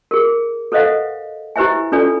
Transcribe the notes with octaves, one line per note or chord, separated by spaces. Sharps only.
G#4 A#4
A4 B4 C5 D#5 F5 F#5
E4 G4 B4 C5 E5 G#5
C#4 F4 A4 B4 D5 G#5